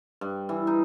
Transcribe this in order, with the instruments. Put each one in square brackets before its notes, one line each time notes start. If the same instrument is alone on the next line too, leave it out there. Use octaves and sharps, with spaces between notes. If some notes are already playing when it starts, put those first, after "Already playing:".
[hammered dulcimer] G2
E3
D#4